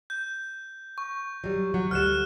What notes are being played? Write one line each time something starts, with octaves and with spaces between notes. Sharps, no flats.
G6
C#6
F#3 G3
F#3
D2 G3 F6 F#6 E7